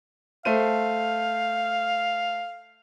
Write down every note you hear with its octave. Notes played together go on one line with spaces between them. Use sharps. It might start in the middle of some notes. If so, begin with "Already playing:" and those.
A3 C5 F5 D#7